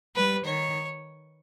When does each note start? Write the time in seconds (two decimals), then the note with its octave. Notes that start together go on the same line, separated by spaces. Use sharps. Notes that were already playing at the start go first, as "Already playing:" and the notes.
0.15 G3 B4
0.45 D#3 C#5